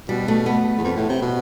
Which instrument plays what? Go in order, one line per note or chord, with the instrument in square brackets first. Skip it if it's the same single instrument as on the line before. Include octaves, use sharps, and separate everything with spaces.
[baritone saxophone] B2 [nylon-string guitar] G3
[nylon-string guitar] A3
B3
[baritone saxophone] E2
F2
A2
C3
B2